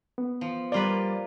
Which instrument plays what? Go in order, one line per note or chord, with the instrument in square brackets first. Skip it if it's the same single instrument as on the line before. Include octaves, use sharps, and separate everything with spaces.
[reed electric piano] B3
[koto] F3
[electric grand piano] G3 D5 [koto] A#3 F4 B4